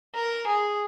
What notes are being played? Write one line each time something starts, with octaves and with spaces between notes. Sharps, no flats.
A#4
G#4